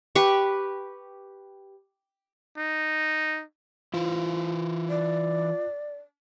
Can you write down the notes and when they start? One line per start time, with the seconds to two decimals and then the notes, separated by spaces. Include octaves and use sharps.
0.15 G4 B4 C#6
2.57 D#4
3.94 E3 E4 F4 C5
4.90 D5